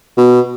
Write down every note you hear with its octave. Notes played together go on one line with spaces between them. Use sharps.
B2